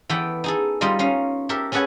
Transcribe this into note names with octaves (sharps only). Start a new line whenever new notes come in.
E3 B3 A4 G5
D#4 G#4 A4
G3 D#4 F4 D#5
C#4 D#4 F5
G4 A4 A#4 E5
C#4 G#4 A4 B4 F#5 G#5